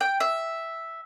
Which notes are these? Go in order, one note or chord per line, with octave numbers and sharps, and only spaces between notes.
G5
E5